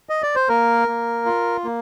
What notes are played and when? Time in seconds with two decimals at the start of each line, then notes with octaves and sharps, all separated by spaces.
0.09 D#5
0.23 D5
0.36 C5
0.49 A#3 A#4
0.88 A#3
1.26 F4
1.64 A#3